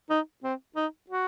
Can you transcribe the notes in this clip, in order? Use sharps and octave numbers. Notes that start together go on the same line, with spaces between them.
D#4
C4
D#4
F#4